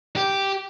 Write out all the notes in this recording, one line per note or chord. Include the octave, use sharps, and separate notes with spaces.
G4